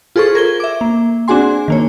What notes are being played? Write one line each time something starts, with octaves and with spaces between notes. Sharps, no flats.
F4 G#4 A4 C5 C#6
A#4 G#6 G7
E5 D6
A#3
C4 D4 F#4 G#4 G#5 C6
D#3 A#3 C#5